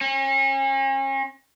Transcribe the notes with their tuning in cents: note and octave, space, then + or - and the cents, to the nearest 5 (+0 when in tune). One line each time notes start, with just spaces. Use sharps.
C#4 -40